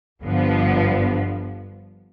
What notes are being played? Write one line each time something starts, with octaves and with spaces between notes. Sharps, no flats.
G1 G2 D3 F3 B3